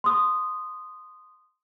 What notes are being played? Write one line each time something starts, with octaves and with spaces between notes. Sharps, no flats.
C6 D#6